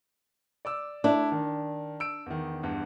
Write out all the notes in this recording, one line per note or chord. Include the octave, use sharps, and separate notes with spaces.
D5 D6 E6
A3 D4 E4
D#3
E6 D7
E2 D#3
E2 G2